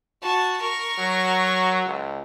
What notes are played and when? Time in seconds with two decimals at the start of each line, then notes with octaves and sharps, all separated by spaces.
0.22 F#4 A5
0.61 A#4 C#6
0.99 F#3
1.87 C#2